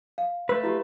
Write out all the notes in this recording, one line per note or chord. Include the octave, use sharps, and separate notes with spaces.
F5
A3 B4 E6
E4 F#4 G4